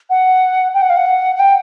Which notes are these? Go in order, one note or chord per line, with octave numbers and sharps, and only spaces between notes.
F#5
G5
F#5
F5
F#5
F#5
G5